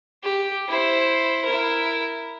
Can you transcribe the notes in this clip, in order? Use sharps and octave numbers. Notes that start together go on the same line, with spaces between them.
G4
E4 C5
E4 A#4